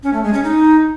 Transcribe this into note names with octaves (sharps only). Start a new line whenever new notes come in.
C#4
A3
G#3
C#4
D#4